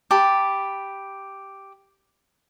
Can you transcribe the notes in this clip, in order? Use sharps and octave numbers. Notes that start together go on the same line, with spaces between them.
G4 A5 B5